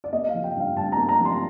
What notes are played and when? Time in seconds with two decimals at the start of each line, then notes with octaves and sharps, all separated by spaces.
0.04 D5
0.13 A#3 D#5
0.29 F5
0.34 F3
0.44 G5
0.55 G2 F5
0.76 G2 A5
0.92 A#5
0.97 A#3
1.09 A#5
1.20 F3
1.25 C6